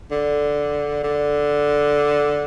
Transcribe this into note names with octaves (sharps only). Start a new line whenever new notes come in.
D3
D3